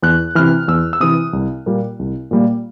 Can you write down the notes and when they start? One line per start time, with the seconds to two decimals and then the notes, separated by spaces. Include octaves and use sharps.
0.03 E2 F#6
0.35 C3 E3 F6
0.68 E2 E6
0.93 E6
1.00 C3 E3 D#6
1.33 C2
1.66 A#2 G3 A#3
1.99 C2
2.31 A#2 G3 A#3